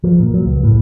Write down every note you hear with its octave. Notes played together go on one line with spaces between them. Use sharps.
F3
A#2
F#3
C#2
A2